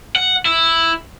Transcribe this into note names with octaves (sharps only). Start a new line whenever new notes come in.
F#5
E4